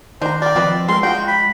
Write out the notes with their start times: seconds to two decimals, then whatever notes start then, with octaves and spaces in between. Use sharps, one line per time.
0.22 D#3 D4 C5 A#5
0.42 A#4 D5 G5
0.56 F3 C4 B4 D#5
0.88 G#3 C4 A#4 C6
1.03 F3 D#4 F#4 G5
1.28 B5